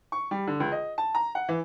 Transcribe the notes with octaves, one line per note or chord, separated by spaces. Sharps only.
C#6
G3
D3
C#2
D#5
A5
A#5
F#5
E3